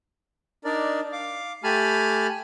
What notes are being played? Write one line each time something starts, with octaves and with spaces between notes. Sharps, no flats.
D4 D#4 A#4 D5
F5 D6
A3 G4 G#5 A5 B5 F6